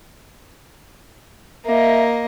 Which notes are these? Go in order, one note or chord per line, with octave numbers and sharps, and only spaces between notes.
A#3 D#5 E5